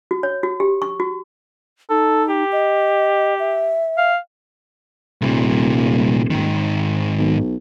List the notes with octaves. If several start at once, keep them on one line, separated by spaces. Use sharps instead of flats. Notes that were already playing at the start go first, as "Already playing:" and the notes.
F#4
C#5
F#4
G4
C#6
F#4
D#4 A4
G4
D#5
E5
F5
D#1 C2 A#2
G#2 D#3
B1